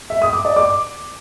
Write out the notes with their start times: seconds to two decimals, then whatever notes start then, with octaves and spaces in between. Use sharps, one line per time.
0.10 E5
0.22 D#6
0.33 D6
0.45 D5
0.56 D6